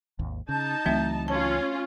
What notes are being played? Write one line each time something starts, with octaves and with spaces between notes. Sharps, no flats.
G#1 D#2
C#3 D#4 A5 G6
C#2 E3 F#3 A3 C4 E5
C#4 F4 C#5 A5